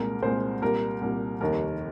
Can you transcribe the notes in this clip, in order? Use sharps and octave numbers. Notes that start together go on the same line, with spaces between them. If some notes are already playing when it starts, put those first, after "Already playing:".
Already playing: C2 A#2 G#3 A#4
C2 A#2 G#3 C5
C2 A#2 G3 A#4
C2 A#2 G3
F1 D#2 D#3 G3 A#4